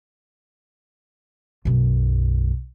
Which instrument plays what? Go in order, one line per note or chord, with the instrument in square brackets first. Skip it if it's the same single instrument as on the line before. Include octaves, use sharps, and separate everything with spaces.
[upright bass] B1 F#2